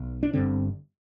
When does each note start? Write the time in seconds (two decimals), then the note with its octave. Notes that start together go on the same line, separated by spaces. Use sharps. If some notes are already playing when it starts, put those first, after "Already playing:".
Already playing: B1
0.23 D4
0.33 G1 G2 D3 C4